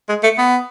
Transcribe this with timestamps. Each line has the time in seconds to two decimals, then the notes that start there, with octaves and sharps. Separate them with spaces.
0.09 G#3
0.23 A3
0.38 B3